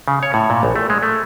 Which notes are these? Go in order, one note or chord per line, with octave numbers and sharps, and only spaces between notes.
C#3
C#5
A2
A#2
A#1
A3
G#3
A3